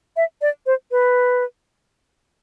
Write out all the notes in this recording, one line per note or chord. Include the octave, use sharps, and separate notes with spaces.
E5
D5
C5
B4